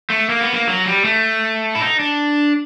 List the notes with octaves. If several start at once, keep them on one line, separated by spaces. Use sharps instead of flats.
A3
A#3
B3
A#3
F#3
G3
A3
E4
D#4
D4